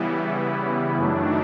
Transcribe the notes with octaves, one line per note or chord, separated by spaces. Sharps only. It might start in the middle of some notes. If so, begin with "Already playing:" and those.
Already playing: C#3 E3 G3 B3 E4
F#2 D#3 F#3 A3 D4